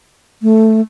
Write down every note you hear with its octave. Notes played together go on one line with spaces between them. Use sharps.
A3